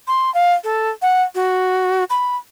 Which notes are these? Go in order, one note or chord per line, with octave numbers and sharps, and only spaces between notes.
C6
F5
A4
F#5
F#4
B5